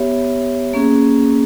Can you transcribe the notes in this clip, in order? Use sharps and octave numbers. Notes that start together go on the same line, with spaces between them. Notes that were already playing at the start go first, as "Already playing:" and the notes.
Already playing: B3 G4 C#5 E5
A#3 C#4 G#4